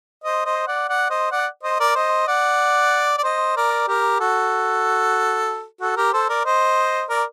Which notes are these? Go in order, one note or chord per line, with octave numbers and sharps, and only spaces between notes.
C5 D#5
C5 D#5
D5 F#5
D5 F#5
C5 D#5
D5 F#5
C5 D#5
A#4 D5
C5 D#5
D5 F#5
D5
C5 D#5
A#4 D5
G4 A#4
F#4 A4
F#4 A4
G4 A#4
A4 C5
A#4 D5
C5 D#5
A#4 D5